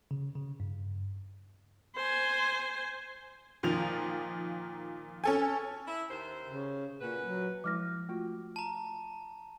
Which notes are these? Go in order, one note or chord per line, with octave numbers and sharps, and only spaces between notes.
C#3
C#3
G2
C5 G#5
A#2 D#3 F3 F7
C#4 A4 G#5
E4 E5
D#2 C5
C#3
A#2 C#4 F#4 B4
F#3
F3 G#3 E4 D6 F6 A#6
A3 F4 F#4
A5 A#5